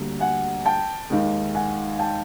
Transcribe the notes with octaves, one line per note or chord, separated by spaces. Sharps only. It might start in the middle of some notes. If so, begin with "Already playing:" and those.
Already playing: D2 D3 G3 A#3
F#5 G#5
G5 A5
D#2 D#3 G#3
F#5 G#5
G5 A5